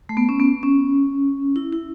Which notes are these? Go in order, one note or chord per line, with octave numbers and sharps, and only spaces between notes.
A3
B3
C#4
B3
C#4
E4
E4